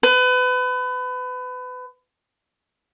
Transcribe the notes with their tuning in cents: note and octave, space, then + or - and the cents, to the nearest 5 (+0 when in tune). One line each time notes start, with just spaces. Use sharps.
B4 +30